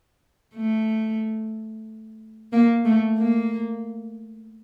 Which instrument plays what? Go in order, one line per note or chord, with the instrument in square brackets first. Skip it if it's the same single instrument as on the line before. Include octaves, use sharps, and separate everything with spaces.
[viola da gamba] A3
A#3
A3
A#3